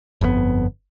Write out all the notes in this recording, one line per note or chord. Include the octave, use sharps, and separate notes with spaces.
G1 F2 G#2 B3